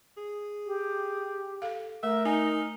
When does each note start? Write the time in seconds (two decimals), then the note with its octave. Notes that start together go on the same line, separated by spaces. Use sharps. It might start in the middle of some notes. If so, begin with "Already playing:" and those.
0.17 G#4
0.66 G4
1.62 A4 F5
2.03 A3 A#4 E5
2.25 D#4 G#5